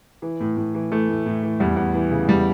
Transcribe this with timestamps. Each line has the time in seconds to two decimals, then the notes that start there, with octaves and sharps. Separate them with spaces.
0.22 E3
0.40 A2
0.57 A2
0.75 E3
0.91 E3 A3
1.09 A2
1.26 A2
1.43 E3
1.60 E2 G3
1.76 E2
1.94 E3
2.11 C#3
2.28 E2 G3